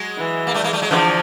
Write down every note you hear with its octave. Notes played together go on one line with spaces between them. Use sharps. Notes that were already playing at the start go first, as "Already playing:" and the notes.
Already playing: F#3 G#3
E3
A#3
G3 A3
G#3 A#3
G3 A3
F#3 G#3
D3 E3 F3